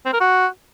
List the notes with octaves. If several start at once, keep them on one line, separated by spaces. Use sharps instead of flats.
C4
A#4
F#4